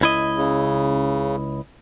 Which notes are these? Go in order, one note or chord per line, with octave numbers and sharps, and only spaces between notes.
C#2 E4 D#5
C#3